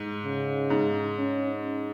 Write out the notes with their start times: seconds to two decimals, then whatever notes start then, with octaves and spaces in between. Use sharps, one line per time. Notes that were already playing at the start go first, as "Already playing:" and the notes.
Already playing: G#2
0.24 C#3
0.70 G#2
1.18 C#4